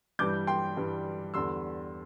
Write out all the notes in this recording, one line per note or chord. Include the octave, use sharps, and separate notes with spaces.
G2 E3 G3 D6 G6
G5 C6
G2 E3 G3
E2 D3 G3 C6 E6